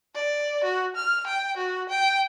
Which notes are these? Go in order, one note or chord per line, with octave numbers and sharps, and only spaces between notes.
D5
F#4
F6
G5
F#4
G5